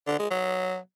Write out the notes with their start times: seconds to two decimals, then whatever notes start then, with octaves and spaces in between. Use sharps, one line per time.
0.07 D3
0.19 G#3
0.30 F#3